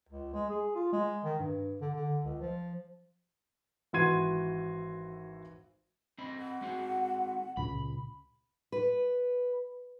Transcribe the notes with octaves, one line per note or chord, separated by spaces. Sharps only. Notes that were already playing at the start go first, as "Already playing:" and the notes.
C#2
G#3
G#4
F4
G#3
D#3
G2
D3
D3
C#2
F3
G#1 E3 F#4 C6 G#6 D#7
C4 D#5 B5
F#5
G#3 C4 F#4
C#2 A#2 C#3 B5
B4